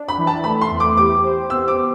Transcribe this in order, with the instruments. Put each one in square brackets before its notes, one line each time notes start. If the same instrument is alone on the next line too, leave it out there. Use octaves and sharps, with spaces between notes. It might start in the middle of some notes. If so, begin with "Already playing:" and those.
Already playing: [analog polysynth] D4
[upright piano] B5
[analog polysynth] E3
[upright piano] A5
[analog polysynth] A3 [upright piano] B5
[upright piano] C6
[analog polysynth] E2
[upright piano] D6
[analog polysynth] G4 [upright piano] D6
[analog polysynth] C5
[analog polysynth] B3 [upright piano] E6
[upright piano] D6